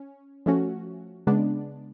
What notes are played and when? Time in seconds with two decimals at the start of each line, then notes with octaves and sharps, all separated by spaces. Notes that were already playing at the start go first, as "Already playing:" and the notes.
Already playing: C#4
0.46 F3 A3 C#4 F#4
1.27 C#3 G#3 B3 D4